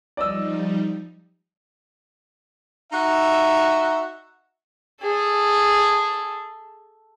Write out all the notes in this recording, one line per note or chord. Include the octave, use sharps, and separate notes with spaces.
F3 G3 D#4 D5 D#5 E6
D#4 F#4 E5
G#4 A4